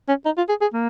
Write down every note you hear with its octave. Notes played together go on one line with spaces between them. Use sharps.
C#4
D#4
F4
G#4
G#4
A#3